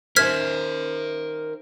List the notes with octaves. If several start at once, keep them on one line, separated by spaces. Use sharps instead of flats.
D#3 A#4 C5 E5 F6 G#6 B6